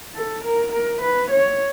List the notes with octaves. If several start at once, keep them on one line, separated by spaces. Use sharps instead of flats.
A4
A#4
A#4
B4
C#5